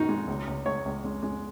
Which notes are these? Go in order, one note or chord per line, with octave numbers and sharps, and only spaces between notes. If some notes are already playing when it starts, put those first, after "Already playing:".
Already playing: A#1 D#3 D#4 F#4
G#3
C#2
C#2
C#2 C#5
C#2
G#3
G#3